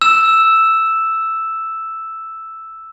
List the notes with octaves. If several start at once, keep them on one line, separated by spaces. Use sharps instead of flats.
E6 E7